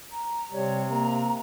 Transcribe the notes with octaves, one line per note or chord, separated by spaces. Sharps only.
A#5
C3 G3 C#5
A#3 A#5